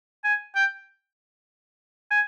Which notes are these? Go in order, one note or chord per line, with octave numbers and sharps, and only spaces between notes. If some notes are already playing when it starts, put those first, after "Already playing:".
G#5
G5
G#5